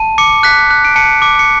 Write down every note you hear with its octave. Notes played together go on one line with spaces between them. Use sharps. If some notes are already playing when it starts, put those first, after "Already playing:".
Already playing: A5
D6 C#7
F#6 B6
F#6
D7
A5 C#7
D6
C#7